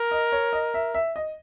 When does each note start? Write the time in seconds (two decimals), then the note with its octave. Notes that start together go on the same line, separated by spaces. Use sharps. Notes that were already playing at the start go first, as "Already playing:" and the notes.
Already playing: A#4
0.11 D#5
0.32 C#5
0.53 D#5
0.74 E5
0.94 E5
1.16 D#5